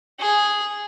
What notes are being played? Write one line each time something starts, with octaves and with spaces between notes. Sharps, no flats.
G#4